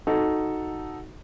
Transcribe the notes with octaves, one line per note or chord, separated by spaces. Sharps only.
D#4 F#4 A4